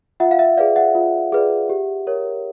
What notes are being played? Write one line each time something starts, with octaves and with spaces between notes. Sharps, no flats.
F4 E5 F#5
F5
E5
G#4 B4 D5 F5
E5 F#5
F4
G#4 B4 D5
G4
A#4 C#5